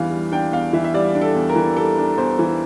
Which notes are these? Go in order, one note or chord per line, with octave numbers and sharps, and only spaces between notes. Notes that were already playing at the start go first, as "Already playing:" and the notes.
Already playing: E2 E3 G3 D4 F5
G3
D4 G5
E2 F5
E3 E5
E5
G3 D5
D4
A4
E2
A#4
E3
G3 A4
D4
E2 C5
E3